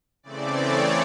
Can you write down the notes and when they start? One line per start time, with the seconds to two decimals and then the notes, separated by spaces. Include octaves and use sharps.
0.23 C#3 E3 A3 C4 D5
0.56 C#5